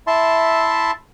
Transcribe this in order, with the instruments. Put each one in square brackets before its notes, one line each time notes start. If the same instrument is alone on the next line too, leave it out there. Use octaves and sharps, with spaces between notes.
[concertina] E4 E5 A5 C6